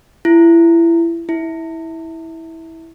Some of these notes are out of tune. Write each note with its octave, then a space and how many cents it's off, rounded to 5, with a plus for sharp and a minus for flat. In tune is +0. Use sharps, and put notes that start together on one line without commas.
E4 +25
E4 -15